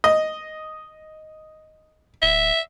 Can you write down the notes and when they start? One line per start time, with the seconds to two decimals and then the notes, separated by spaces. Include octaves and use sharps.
0.04 D#5
2.22 D1 E5